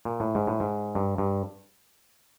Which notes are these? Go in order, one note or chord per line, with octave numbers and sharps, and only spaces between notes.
A#2
A2
G#2
A2
G#2
G2
G2